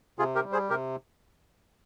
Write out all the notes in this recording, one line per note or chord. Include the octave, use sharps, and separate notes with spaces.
C3 F4 G#4
G4 A#4
G3
G#4 C5
C3 G4 A#4